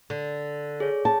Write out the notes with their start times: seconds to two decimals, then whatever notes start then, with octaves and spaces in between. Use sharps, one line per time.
0.10 D3
0.80 G#4 C#5
1.05 A5